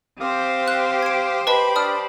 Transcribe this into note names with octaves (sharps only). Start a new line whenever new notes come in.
C4 G4 C5 F5 D6 D#6
F#6
G#6 D7
B4 D#5 G5 A5 B5
D4 D5 A5 D#6 F6